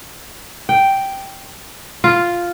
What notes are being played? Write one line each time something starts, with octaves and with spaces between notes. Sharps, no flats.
G5
F4